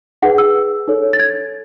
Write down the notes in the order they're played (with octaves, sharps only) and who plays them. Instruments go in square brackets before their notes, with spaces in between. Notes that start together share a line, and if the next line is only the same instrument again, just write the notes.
[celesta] D#4 G#4 B4 F#5
E6
D#4 A4 C#5
A6
G#6